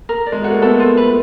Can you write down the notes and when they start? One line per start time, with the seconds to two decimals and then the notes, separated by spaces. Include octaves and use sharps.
0.09 A#4
0.26 D5
0.32 G#3
0.42 A3 F#4
0.51 A#3
0.62 A3 B3 A4
0.80 F4
0.97 B4